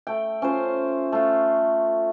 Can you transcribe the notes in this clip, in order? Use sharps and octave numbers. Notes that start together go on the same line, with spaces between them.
A3 G5
C#4 F4 C5
A3 F4